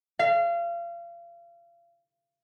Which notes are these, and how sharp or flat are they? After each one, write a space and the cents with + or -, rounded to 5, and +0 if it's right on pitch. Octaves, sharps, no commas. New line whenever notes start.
F5 -30